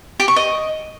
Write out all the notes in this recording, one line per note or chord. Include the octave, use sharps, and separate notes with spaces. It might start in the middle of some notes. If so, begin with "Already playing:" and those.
G4
C#6
D#5